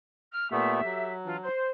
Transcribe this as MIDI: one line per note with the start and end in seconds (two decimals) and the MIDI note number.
0.33 0.51 89
0.52 0.81 46
0.52 0.81 57
0.52 0.81 59
0.52 1.14 67
0.52 1.14 69
0.52 1.14 76
0.84 1.48 54
1.26 1.36 52
1.26 1.36 62
1.26 1.36 65
1.43 1.71 72